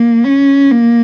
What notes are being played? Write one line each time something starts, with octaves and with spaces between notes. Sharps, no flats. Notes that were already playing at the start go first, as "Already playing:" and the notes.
Already playing: A#3
C#4
A#3